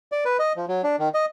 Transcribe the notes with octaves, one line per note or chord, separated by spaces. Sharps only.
D5
B4
D#5
F3
F#3
D4
D#3
D#5